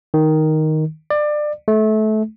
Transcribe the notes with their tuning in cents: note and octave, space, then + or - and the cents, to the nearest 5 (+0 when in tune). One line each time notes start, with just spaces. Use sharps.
D#3 +5
D5 +25
A3 -25